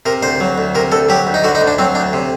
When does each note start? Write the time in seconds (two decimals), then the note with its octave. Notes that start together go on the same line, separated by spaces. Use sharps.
0.06 C3 A#4
0.23 D2 C5
0.40 F#3
0.58 D2
0.75 C3 A#4
0.92 D2 A4
1.09 F#3 G4
1.27 D2
1.34 D#4
1.44 D3 F#4
1.55 D#4
1.61 D2
1.67 D4
1.78 F#3 C4
1.95 D2 D4
2.13 C3